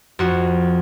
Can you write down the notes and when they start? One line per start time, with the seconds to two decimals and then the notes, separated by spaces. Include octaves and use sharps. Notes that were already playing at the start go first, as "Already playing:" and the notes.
0.19 F2 F#4